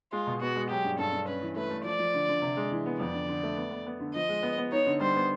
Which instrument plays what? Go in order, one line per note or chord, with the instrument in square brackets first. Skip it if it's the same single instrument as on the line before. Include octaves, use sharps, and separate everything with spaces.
[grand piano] G#3 [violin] F4
[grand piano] B2
[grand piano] B3 [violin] F#4
[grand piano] G#3
[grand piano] F#3 [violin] G4
[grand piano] G2
[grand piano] G2 [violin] A4
[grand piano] G2
[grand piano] C#4 [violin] B4
[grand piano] E3
[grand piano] A3 [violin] B4
[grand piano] A3
[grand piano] F3 [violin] D5
[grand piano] F3
D3
D3
C3
G#3
E3
B3
[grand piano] F2 [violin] D5
[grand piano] D3
D3
A3
B3
B3
B3
D3
[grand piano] F3 [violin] D#5
[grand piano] G#3
B3
B3
[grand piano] D#4 [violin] C#5
[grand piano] D3
[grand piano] G3 [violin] C5
[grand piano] B3